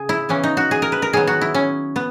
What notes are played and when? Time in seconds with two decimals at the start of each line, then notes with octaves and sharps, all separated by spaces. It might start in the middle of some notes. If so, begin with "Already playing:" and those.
Already playing: C#3 G#4
0.09 E4
0.29 C#3 E3 B3 C#4
0.44 D#4
0.57 F#4
0.71 G#4
0.82 A#4
0.92 B4
1.02 A#4
1.13 D#3 F#3 B3 G#4
1.27 F#4
1.41 E4
1.54 C#4
1.96 B3